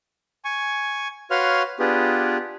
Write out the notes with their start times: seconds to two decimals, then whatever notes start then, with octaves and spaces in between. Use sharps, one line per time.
0.45 G#5 C#6
1.31 F#4 B4 C#5 F5 C6 F6
1.79 B3 D4 F4 G4 G#4 B4